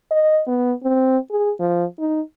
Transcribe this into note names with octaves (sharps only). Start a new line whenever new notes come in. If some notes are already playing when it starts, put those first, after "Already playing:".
D#5
B3
C4
G#4
F3
D#4